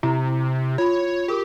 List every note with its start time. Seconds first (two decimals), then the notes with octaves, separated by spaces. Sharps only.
0.03 C3 E4 A#5
0.78 F4 C#5 B5
1.28 G4 G#4 A#4